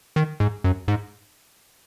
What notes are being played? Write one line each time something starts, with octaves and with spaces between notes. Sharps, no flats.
D#3
G#2
F#2
G#2